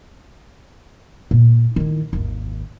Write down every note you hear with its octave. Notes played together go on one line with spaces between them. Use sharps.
A#2
D#3 E4
G#1 D#2